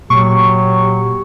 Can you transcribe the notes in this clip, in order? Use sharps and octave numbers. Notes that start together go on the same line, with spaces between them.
A#2 F#3 A#3 G4 C#6